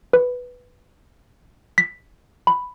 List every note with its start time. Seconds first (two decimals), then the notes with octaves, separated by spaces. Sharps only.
0.13 B4
1.78 B6
2.47 B5